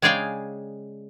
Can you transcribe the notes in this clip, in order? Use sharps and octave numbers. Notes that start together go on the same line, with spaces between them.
C#3 G#3 G#4 D5 F5 G5